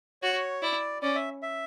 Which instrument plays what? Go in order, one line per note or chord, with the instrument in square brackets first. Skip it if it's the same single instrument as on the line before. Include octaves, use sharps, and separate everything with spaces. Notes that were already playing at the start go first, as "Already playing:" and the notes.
[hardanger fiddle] F#4 [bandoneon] C#5
[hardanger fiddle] E4 [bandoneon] D5
[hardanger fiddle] C#4 [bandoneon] D5
[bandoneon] E5
E5